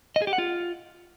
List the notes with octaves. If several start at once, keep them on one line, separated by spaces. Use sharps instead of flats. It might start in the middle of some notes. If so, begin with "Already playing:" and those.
D#5
G#4
G4
F#5
F4